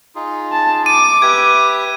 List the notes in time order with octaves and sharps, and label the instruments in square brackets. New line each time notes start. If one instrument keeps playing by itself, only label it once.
[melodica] D#4 F4 G#4
[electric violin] A5
[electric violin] D6 [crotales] D#7
[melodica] G4 B4 E5 [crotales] G#6